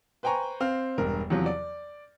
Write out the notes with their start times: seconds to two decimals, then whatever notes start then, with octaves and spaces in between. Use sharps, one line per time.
0.23 B4 C5 G5 G#5 A#5 C#6
0.60 C4 F5 F6
0.98 E1 G2 A#4
1.30 E2 C3 F3 F#3
1.46 D5